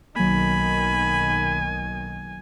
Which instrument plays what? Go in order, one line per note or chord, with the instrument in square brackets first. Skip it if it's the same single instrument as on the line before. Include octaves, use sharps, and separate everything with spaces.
[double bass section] B1 D#3 [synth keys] F#3 A#3 [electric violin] G#5 [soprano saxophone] B5